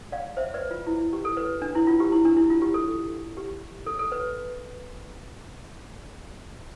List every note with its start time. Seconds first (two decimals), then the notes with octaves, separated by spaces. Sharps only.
0.12 D5 F5
0.37 C5 E5
0.54 B4 D5
0.71 F4
0.87 E4
1.13 G4
1.25 A4
1.37 B4
1.62 D4
1.75 E4
1.87 F4
2.00 G4
2.12 E4
2.25 D4
2.37 E4
2.50 F4
2.62 G4
2.74 A4
3.37 G4
3.86 A4
3.99 A4
4.12 B4